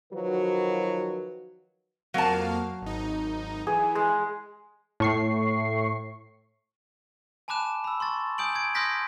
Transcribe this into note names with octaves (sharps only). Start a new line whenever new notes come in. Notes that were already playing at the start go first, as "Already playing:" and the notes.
D#3 F3 F#3 F#4 B4
F2 F#3 A#3 F5 A5
G#1 D#4
E3 G#4
G#3
A2 C#6 C7
G#5 A5 B5 D6 F#6 E7
B5 E6
C6 C#6 A6
G#5 D#6 G6 D7 F#7
G#6 D7
C6 D#6 F6 G6 A#6 B6